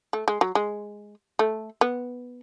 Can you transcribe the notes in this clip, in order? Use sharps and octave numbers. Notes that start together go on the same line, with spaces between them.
A3
G#3
F#3
G#3
A3
B3